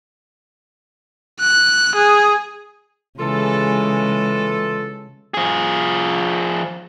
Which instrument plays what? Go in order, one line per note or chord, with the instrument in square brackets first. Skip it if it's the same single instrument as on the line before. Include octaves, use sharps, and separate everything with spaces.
[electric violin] F#6
G#4
[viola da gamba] C#3 G#3 [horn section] E3 F4 A4
[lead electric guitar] F3 G#4